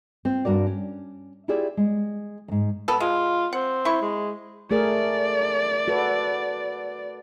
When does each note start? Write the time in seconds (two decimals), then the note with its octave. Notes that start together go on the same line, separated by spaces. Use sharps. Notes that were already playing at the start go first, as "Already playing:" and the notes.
0.25 C4 F4
0.45 G2 F#4 A#4 D5
0.67 C#4
1.48 E4 F4 G4 G#4 D5 E5
1.77 G#3
2.48 E2 G#2
2.88 B3 A4
3.00 G#3 F4
3.53 C4 F#5
3.85 E4 C#6
4.01 G#3
4.71 A3 G#4 A#4 D5
5.88 F#4 A4 B4